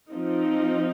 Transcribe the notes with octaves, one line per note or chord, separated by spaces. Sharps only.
F3 C4 D#4